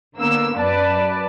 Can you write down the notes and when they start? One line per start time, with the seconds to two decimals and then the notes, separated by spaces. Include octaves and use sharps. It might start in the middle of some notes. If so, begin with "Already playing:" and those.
0.18 D3 A#3 B3 E6
0.57 F#2 B4 D5 A5